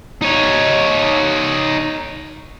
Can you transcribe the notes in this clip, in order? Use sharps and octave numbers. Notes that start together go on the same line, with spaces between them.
D#4 C#5